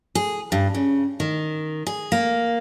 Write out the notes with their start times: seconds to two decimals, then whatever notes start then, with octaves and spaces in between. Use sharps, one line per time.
0.15 G#4
0.52 G2
0.75 C#3
1.20 D#3
1.87 G#4
2.12 A#3